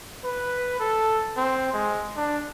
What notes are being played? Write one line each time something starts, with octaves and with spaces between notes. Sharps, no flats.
B4
A4
C4
G#3
D4